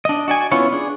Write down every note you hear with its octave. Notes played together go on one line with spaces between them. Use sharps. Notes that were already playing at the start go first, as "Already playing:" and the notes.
D4 D#5
F#4 D5 G#5
B3 C#4 E4 F4 C#5
D4 G#4